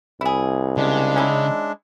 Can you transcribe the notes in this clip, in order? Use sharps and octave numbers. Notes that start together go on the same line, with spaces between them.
C2 E4 G#4
C#3 G#3 D4
C#4 D#4 E4